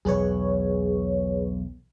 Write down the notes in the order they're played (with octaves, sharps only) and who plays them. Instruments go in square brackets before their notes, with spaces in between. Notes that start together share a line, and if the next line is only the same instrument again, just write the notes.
[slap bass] B1 E2 [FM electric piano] G#4 B4 C#5